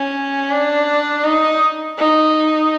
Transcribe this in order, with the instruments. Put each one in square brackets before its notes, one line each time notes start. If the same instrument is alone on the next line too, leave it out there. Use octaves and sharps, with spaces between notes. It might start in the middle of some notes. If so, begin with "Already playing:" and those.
Already playing: [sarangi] C#4
D4
D#4
D#4